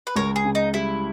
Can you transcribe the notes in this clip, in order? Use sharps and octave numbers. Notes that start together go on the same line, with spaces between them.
B4
C#2 A#4 C#5
G#4
C#3
D#4
G3 E4